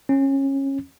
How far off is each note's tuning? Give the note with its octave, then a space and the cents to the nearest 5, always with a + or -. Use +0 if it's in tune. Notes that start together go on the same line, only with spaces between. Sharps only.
C#4 -20